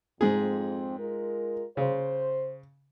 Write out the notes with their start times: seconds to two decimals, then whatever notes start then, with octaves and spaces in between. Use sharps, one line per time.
0.21 F2 G#2 C4 G#4
0.98 G#3 F4 A#4
1.77 C#3 C5